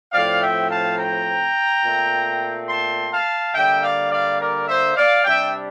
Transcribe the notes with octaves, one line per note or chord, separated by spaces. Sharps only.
A2 F3 C4 D5 F5
E5 G5
F5 A5
G5 A#5
A#2 A3 C4
A5 C6
F5 A5
D3 G3 A#3 E5 G5
D5 F5
D5 F5
A#4 D5
C5 E5
D5 F5
C3 G3 D4 E5 G5